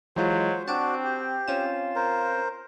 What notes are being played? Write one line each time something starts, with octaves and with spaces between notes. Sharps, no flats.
E3 F#3 G#3 F4 C5
C4 D4 F#4 A5 D7
G4
C4 C#4 F4 E7
A#4 C5